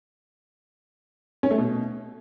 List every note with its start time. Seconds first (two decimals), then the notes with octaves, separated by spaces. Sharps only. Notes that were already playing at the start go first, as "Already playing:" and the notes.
1.43 C#4
1.51 A3
1.58 B2